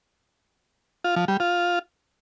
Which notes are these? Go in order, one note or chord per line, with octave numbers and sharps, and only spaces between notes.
F4
F3
G3
F4